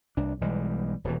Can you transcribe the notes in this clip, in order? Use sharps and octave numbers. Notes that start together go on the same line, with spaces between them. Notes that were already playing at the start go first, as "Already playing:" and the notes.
C2 D4
B1 E3 G3 G#3
D#1 B2 E3